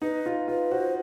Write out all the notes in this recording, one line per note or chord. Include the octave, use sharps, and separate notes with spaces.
D#4 B4
F4
F4 B4
F#4 C5